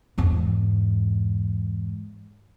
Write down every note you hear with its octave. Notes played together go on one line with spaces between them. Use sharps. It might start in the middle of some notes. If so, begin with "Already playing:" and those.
E2 G#2